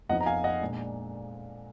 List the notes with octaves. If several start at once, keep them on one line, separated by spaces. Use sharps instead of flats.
F2 F3 B3 D#4 D#5 F#5
A#5
F5 G#5
D#5 F#5
A#2 G#3 D4